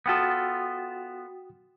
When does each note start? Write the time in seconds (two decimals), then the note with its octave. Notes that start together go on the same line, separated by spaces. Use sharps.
0.06 B3 F4 F#4 A4 G5 D#6